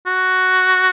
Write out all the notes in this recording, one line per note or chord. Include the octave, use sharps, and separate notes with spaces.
F#4